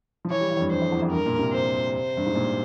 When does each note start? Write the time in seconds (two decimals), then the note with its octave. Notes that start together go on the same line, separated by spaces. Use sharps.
0.25 F3
0.30 E3 C#5
0.41 G3
0.51 E3
0.57 F2
0.61 G2
0.71 G2 C5
0.82 F2
0.92 E2
1.02 F2
1.12 G2 A#4
1.26 A#2
1.39 C3
1.53 C5
1.94 C5
2.17 G2
2.26 G#2
2.35 A#2